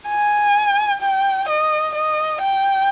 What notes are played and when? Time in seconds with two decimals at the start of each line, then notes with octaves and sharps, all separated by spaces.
0.09 G#5
1.02 G5
1.49 D#5
1.95 D#5
2.42 G5